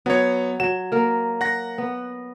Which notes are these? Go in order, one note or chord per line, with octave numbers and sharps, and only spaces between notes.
F#3 B3 C#5
F#3 E7
A#3 A#4
F#5 A#6
B3